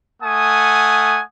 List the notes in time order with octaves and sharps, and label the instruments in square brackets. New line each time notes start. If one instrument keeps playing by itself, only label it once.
[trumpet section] A3 F#5 G#5 D#6